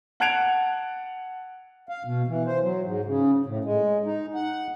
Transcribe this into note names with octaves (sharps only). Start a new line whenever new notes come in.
F#5 A5 F#6 G#6 D7 F7
F5
B2
E3
C5
F#3
G#2
C#3
A2
G#3
D#4
F#5